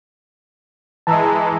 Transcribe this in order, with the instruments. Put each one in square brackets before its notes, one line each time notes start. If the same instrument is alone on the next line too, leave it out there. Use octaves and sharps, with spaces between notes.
[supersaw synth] E3 G#3 [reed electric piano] A5 A#5 E6